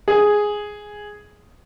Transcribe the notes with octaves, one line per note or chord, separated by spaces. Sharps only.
G#4